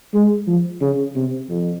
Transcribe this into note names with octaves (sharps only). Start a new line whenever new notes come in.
G#3
F3
C#3
C3
F2